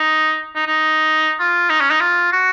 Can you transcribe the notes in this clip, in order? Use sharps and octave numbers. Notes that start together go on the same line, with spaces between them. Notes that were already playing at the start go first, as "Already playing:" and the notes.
Already playing: D#4
D#4
D#4
F4
D#4
C#4
D#4
F4
F#4